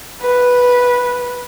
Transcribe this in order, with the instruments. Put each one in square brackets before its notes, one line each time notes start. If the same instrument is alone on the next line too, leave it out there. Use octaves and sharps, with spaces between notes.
[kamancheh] B4